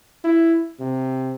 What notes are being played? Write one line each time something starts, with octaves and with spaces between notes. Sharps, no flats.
E4
C3